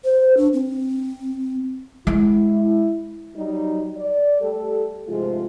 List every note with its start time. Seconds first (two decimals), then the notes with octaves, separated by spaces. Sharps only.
0.05 C5
0.37 D4
0.53 C4
2.07 G#3 E4
3.36 F#3 G3 D#4
3.97 D5
4.41 G3 A3 G4 A4
5.08 G#2 C3 F3 G#3 A3 F4